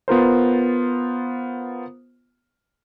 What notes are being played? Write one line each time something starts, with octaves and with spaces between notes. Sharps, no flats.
B3 F4 A#4 C5